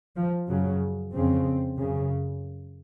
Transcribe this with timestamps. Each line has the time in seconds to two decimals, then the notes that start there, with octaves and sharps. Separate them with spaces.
0.16 F3
0.48 F#2 C#3 F#3
1.13 F2 C#3 C4
1.78 F#2 C#3